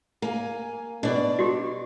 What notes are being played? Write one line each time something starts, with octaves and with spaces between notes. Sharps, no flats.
A#3 G#5
B2 D4 D5
F#4 G4